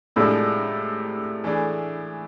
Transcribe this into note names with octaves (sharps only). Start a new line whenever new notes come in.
A2 C3 F3 G#3 D4 A4
E3 A3 D4 G#4